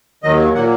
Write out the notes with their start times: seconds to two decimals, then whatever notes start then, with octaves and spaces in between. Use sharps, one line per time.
0.23 D#2 D#3 F#3 D#5
0.55 A#2 F#3 A#3 F#5